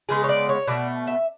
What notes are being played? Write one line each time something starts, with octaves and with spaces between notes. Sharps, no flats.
C#3 G#3 B3 G#4
C#5
D5
C#5
B2 A3 D5
E5